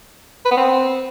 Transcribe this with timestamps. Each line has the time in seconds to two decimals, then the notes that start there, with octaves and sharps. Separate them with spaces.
0.45 B4
0.51 B3
0.57 C4